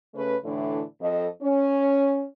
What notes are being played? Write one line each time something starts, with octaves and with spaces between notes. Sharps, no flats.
C#3 A3 C#4 B4
A2 D3 E3 D4 E4
F2 A4 D#5
C#4